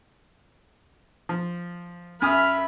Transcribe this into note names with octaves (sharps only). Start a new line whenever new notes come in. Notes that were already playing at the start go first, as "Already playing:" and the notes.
F3
F#2 E5 G#5 B5 D#6 F6